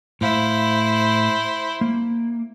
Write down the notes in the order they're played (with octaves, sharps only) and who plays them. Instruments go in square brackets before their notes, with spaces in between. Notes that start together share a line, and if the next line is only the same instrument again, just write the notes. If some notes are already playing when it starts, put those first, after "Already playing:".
[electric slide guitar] A2 F5 [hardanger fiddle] E4 C5
[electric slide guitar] A#3